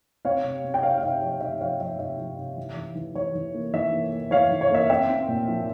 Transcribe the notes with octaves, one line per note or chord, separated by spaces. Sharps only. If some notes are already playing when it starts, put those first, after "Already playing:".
C4 C#5 F5
C3
C4
G5
C3 C#5 F5
F5
C3 E5
F3 C#5
C3 E5
F3 C#5 F5
F3 E5
C3 E5
F3
C3
E3
E3
E3
E3 C#5
E3
A#3
E3 E5
A#3
A#3
E3 C#5 F5
E3
C#5
A#3 E5
C4 E5 G5
C4
A#2
F3